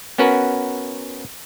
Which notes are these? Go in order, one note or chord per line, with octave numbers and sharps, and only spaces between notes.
B3 C#4 F#4 A#4 B4